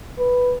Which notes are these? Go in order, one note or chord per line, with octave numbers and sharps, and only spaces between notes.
B4